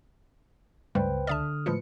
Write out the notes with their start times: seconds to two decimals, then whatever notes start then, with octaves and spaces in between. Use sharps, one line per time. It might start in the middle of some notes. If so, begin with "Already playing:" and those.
0.95 C#2 G2 G3 A3 B4 C5 G5
1.27 D3 D5 E5 A5 D#6 F6
1.66 A2 F3 G#3 F4 B4 C#7